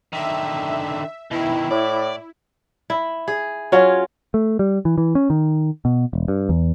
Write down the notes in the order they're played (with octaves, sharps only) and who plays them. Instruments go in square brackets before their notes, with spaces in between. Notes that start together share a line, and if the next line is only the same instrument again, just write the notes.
[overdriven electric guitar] D3 D#3 [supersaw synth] E5
[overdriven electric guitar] B2 D#3 [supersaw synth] E4
[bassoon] A2 [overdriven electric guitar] D5
[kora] E4
G#4
F#3 C#4 F4
[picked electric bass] A3
G3
E3
E3
C#4
D#3
B2
E1
G2
E2